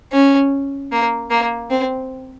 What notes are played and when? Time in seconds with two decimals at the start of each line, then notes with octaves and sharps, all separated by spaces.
0.12 C#4
0.92 A#3
1.30 A#3
1.70 C4